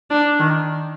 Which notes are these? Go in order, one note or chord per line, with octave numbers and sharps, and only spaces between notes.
D4
D#3